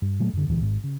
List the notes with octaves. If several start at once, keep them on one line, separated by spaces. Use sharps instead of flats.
G2
A#2 F#3 A3
F#2 D3
E1 D2 A#2 E3
G#1 G#2
C#3